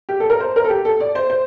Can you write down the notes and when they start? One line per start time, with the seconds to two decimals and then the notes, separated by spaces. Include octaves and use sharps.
0.09 G4
0.20 A4
0.30 A#4
0.40 C5
0.56 A#4
0.64 A4
0.70 G4
0.85 A4
1.00 D5
1.15 C5
1.30 C5